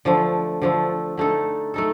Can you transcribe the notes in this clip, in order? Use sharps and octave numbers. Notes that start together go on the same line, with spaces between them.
D3 F3 A3
D3 F3 A3
D3 A3 D#4 A4
A3 D#4 A4